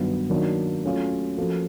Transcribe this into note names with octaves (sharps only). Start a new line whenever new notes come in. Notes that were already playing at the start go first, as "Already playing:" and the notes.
Already playing: G2 D#3 F#3 B3
D#3 F#3 A#3 D4
F#3 A3 C#4 F4
F3 A#3 C#4 F#4 A4